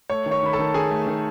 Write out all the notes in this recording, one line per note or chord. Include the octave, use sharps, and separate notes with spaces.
A3 C#5 C#6
D#3
C#5 C#6
D#3 B5
A4 A5
D#3
D#3 G#4 G#5
A3
D#3